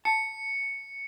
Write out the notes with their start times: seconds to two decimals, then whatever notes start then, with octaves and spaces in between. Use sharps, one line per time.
0.05 A5 C#7